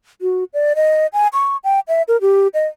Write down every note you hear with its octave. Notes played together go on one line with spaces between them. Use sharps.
F#4
D5
D#5
G#5
C#6
G5
E5
A#4
G4
D#5